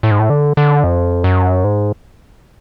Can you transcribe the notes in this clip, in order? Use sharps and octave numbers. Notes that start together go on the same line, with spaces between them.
A2
G#2
A2
D3
D3
F2
F#2
G#2